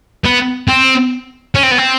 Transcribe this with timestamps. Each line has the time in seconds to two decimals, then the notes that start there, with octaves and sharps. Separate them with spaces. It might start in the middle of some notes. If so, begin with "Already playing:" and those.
0.25 B3
0.68 C4
1.55 C#4
1.63 C4
1.71 B3
1.78 C4